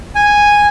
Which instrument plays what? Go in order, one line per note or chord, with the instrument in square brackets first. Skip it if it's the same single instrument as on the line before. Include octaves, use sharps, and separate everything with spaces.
[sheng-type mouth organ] G#5